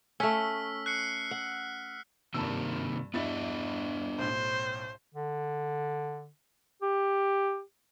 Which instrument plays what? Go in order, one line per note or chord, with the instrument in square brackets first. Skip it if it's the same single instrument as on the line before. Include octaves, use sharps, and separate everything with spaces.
[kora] A3 C#4 [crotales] E6 F6 B6
[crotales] F#6 C7 C#7
[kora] F#5
[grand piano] G2 A5 E6 [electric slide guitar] C3 D#3 A#3
[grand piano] G2 E4 A6 [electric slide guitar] B3 D4 D#5
[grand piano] B1 A2 [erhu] C5
[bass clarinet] D3
G4